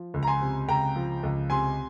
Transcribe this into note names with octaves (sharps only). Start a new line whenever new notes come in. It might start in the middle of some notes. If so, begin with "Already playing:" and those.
Already playing: F3
C#2
A#5
G#5 C6
C3
C#2 G5 A#5
F3
C#2
C3 G#5 C6